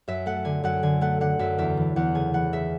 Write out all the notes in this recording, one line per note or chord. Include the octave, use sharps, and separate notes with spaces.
F#2 E5
A3 F#5
D3 G#5
F#2 F#5
D3 G#5
A3 F#5
D3 F#5
F#2 E5
E2 E5
E3
E2 F#5
C#3 G#5
E3 F#5
C#3 E5